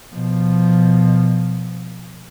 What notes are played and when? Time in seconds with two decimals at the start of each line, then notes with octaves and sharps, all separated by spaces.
0.12 B2 F3